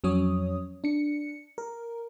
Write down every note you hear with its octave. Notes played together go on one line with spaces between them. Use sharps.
F2 F#3 C#4 C#5 D#6
D4 C#7
A#4